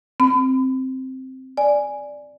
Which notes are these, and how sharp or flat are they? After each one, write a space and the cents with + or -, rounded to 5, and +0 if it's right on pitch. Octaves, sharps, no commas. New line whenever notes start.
C4 +0 B5 +35
D5 +0 G#5 +0